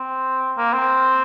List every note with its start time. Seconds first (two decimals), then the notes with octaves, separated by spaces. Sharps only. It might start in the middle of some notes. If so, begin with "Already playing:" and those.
Already playing: C4
0.57 A#3
0.73 C4